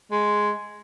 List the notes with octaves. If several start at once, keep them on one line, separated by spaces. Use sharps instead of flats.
G#3